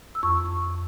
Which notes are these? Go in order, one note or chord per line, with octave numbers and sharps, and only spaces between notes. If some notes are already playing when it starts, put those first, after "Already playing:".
E6
F2 C#6